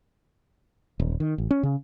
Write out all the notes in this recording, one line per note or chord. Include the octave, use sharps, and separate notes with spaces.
D#1
D#3
A1
C#4
C#3